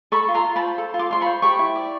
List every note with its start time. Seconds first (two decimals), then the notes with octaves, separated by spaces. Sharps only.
0.12 A4 B5 C#6
0.28 F4
0.34 A#5 C6
0.45 F4
0.56 A5 B5
0.62 C5
0.78 A4
0.94 F4
0.99 C6 D6
1.11 F4 C6
1.21 B5 C#6
1.26 C5
1.42 G4 B5 C#6
1.59 E4
1.76 D5